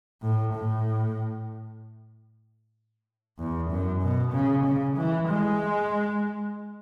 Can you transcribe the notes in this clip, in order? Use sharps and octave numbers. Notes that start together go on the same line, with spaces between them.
A2
A2
E2
F#2
B2
C#3
C#3
E3
G#3